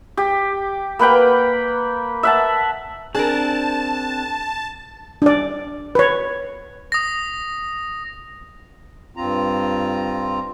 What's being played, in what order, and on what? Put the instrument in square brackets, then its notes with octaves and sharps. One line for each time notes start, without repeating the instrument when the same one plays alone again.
[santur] G4
A#3 B4 F#5 G5
E5 F#5 A5
[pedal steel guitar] C4 D4 [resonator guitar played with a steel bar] G#4 A#4 [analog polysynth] A5
[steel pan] D4 D5
B4 C#5
[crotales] D#6 A#6
[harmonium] G2 C4 F4 A#5